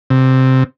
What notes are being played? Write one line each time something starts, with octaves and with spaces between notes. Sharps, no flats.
C3